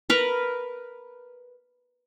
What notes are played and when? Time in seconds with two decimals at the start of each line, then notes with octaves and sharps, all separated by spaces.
0.10 A#4 B4